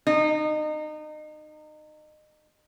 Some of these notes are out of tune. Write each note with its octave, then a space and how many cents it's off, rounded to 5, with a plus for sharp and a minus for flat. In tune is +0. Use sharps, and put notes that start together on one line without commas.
D#4 -30